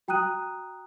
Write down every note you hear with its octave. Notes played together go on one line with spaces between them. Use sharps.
F#4 G5 A#5 D#6 F#6 D#7